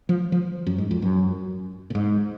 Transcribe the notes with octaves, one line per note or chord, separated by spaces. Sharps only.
F3
F3
F#2
G#2
F2
F#2
A#2
G#2